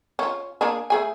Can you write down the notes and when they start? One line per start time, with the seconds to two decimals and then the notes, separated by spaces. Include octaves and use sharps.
0.19 C#4 F4
0.61 A#3 D4 G#4
0.90 A3 G#4 G#5